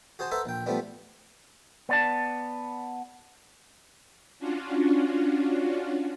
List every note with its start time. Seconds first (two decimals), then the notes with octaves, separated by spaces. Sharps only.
0.19 F#4 G#4 C5 A5
0.31 A4 B4 C5 E5 F#5 A#5
0.46 A#1 G5
0.66 F3 G3 A3 B3 D4
1.89 B3 D5 A5
4.39 C#4 D4 F4 F#4